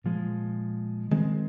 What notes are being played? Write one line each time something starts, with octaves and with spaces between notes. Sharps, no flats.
A#2 F3 G#3
D#3 G#3 C4